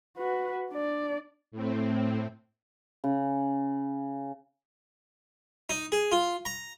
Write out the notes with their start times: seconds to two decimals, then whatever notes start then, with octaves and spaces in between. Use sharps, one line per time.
0.17 F#4 B4
0.70 D4 D5
1.52 A2 C4
3.04 C#3
5.69 D#4
5.92 G#4
6.12 F4
6.45 A#5